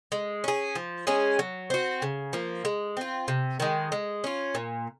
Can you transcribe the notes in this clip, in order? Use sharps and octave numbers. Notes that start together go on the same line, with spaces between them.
G#3
C#4 G#4
F3
G#3 C#4 G#4
F#3
C4 F#4
C#3
F3 A#3
G#3
C4 F4
C3
D#3 G#3
G#3
C#4 F4
A#2